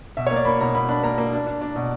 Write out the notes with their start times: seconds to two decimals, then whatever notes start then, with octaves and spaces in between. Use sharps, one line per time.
0.17 B2 E5
0.27 A#3 C#5
0.36 D5
0.45 A#3 B5
0.60 B2 A#5
0.74 B2 B5
0.89 D4 B5
1.03 A#3 A#5
1.18 A#3
1.33 D4
1.47 D4
1.61 D4
1.76 B2